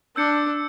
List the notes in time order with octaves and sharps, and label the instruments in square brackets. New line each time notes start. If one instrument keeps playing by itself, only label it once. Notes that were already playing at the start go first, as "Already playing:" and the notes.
[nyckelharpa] D4 [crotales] E6 G6 C#7